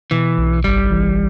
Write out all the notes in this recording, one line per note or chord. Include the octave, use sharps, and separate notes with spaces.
B2 E3
B1
G1 G3
E3